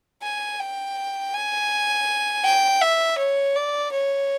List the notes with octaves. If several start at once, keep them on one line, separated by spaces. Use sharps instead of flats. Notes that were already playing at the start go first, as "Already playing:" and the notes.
G#5
G5
G#5
G5
E5
C#5
D5
C#5